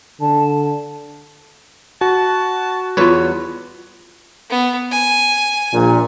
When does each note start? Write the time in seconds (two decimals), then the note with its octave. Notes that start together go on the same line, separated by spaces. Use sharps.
0.21 D3 A5
2.01 F#4 A5
2.97 E2 G3 F4 B4 C#5
4.50 B3
4.91 G#5
5.73 A#1 A#2